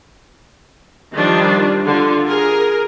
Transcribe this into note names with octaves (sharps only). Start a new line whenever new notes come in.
D#3 F3 G3 D4
D3 F4
G#4 A#4